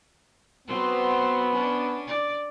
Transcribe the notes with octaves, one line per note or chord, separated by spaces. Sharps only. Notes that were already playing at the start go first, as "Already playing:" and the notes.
F#3 B3 C4 C5
C#4 D4
D5